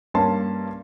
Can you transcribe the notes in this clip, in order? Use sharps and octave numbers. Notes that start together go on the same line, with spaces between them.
G2 A#3 C#4 A5 C6